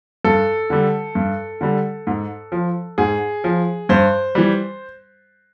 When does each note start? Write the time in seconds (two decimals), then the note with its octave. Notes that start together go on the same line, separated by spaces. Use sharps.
0.24 G2 A4
0.70 D3 G3
1.15 G2
1.61 D3 G3
2.07 G#2
2.52 F3
2.98 G#2 G#4
3.44 F3
3.89 G2 C5
4.35 E3 G3